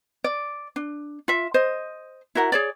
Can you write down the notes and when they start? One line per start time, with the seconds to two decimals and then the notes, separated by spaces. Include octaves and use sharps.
0.24 D5
0.76 D4
1.28 F4 E5
1.54 C5 D#5
2.35 E4 F#4 A#4 F#5
2.52 G#4 C#5 D5